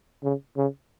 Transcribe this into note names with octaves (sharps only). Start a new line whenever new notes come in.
C#3
C#3